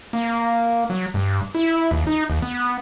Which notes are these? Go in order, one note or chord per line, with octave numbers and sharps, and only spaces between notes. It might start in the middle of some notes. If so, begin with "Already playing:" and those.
A#3
F#3
G2
E4
D#2
D#4
D#2
B3